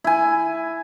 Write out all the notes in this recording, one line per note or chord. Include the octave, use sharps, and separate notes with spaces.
E4 G#5